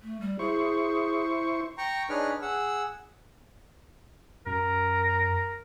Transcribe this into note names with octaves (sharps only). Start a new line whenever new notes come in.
A3
G3
E4 G#4 C5 C#6
G5 A#5 C#6
D4 D#4 G#4 B4 C#5 F6
G#4 F#5 E6
F#2 A#4